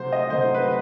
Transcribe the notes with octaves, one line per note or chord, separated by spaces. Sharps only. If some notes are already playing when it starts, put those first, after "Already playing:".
Already playing: C3 F#3 A3 C5
D#5
C3 F#3 A3 C5
B4